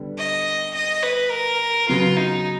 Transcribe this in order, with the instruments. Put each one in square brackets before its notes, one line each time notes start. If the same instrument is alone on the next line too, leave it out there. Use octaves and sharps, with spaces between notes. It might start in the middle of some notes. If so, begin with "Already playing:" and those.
Already playing: [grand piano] D3 G3 B3
[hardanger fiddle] D#5
D#5
B4
A#4
[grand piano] C#3 F#3 B3 [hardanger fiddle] F4
[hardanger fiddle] D#4